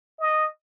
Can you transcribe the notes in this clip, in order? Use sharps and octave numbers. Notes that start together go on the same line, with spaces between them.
D#5